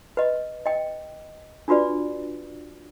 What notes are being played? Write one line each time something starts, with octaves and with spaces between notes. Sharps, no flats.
B4 D#5
D#5 G5
D4 F4 F#4 B4 D5